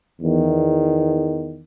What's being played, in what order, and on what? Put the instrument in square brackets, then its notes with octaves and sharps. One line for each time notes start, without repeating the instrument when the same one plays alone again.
[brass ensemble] E2 D#3